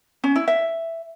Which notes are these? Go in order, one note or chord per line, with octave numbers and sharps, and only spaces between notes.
C#4
E4
E5